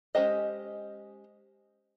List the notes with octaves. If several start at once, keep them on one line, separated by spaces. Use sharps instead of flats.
G#3 C#4 G4 C5 D#5